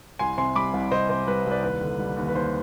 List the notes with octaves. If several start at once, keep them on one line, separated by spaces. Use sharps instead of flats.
C2 G#5 C6
C3 G#5 C6
G3 B5 D6
C2
C2 C5 D#5
C3 C5
G3 B4
C2
B4 D5
D#2 B4
D3
G3
D#2
B4
D#2 C5